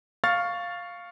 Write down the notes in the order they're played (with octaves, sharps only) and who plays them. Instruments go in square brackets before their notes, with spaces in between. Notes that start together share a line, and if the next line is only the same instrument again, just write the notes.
[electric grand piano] F5 C#6 F6 A6